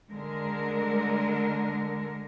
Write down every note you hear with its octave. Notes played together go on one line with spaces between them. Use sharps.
D3 G#3 A#4